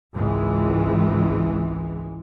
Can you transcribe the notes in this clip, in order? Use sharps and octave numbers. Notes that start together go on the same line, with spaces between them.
G#1 C#2 E3 G#3